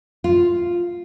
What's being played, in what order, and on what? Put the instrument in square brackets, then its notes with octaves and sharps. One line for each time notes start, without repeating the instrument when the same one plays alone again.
[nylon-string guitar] F4